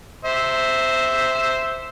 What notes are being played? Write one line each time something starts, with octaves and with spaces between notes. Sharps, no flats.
C5 E5